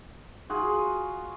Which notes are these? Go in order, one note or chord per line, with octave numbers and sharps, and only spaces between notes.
F4 F#4 G#4